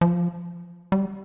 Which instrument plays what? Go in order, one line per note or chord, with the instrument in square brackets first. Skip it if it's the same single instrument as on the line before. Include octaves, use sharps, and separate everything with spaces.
[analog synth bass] F3
G3